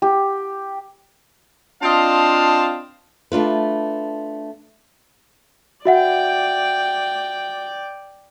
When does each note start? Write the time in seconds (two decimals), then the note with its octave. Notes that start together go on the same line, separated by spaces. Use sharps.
0.02 G4
1.82 C4 D4 F4 D#5 F5 A5
3.32 A3 D4 F4 B4
5.85 F#4 D5 E5 F#5 G5